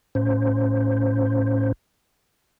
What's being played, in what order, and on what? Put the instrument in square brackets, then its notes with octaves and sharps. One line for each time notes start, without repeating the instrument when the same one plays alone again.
[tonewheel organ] A2 C#4 C5